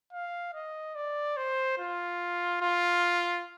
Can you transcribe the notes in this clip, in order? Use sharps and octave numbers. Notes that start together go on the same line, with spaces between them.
F5
D#5
D5
C5
F4
F4